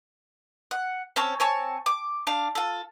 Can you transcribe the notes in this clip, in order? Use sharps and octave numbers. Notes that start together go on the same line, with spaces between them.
F#5
C4 C#4 A4 C#5
C4 C#5 G#5 A5
D6
D4 F5
F4 A4